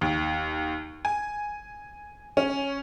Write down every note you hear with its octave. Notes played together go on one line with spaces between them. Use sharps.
D#2
G#5
C#4